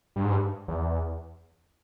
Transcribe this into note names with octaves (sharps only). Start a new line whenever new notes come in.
G2
G#2
G2
E2